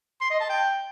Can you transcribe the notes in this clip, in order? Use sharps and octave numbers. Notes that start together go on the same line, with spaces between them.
C6
D#5
A5
G5